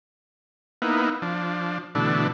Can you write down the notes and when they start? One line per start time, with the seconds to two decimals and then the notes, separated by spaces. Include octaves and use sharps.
0.82 A#3 B3 D#4 E4
1.22 F3 D4
1.95 B2 D3 E3 A3 D4